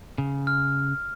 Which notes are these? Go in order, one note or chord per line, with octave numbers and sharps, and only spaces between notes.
C#3
F6